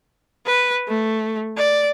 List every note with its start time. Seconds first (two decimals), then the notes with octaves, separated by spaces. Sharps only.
0.46 B4
0.88 A3
1.57 D5